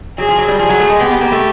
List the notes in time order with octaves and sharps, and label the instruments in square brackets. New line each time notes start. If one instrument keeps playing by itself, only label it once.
[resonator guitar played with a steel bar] F#3 [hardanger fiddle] G#4
[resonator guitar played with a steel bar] F3
F#3
G3
[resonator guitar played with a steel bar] F3 [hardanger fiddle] G#4
[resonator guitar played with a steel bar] F#3
A3
G#3
[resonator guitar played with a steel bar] B3 [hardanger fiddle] G4
[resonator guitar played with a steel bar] B3
A#3
A3